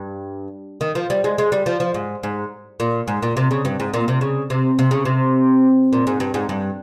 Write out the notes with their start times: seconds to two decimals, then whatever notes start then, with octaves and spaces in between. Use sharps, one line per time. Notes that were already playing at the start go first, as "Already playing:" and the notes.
Already playing: G2
0.81 D#3
0.95 F3
1.10 G3
1.24 G#3
1.38 G#3
1.52 G3
1.66 F3
1.80 F3
1.94 G#2
2.23 G#2
2.80 A#2
3.08 G#2
3.23 A#2
3.37 C3
3.51 C#3
3.65 G2
3.80 G#2
3.94 A#2
4.08 C3
4.21 C#3
4.50 C3
4.79 C3
4.91 C#3
5.05 C3
5.93 A#2
6.07 G#2
6.20 G2
6.34 G#2
6.49 G2